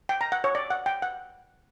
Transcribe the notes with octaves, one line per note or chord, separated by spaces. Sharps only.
G5
A#5
F#5
C#5
D5
F#5
G5
F#5